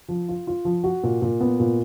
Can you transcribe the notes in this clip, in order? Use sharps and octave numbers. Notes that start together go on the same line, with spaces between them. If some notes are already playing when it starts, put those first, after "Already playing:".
F3
F4
F4
F3
F#4
A#2
A#2
B3
A#2